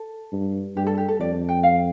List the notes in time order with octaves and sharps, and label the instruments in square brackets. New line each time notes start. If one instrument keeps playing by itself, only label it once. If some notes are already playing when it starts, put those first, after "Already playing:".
Already playing: [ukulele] A4
[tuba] G2
[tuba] G2 [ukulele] G4
[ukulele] A4
G4
A4
[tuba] F2 [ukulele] D5
[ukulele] G5
F5